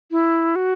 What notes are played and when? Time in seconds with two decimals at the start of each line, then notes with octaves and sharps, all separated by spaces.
0.11 E4
0.56 F#4